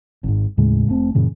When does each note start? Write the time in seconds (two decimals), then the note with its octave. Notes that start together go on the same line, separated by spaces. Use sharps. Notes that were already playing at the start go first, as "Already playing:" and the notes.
0.24 G#1 G#2
0.57 D#2 A2 C#3 G#3
0.88 F1 A3 C4
1.15 F#2 A#2 C#3 E3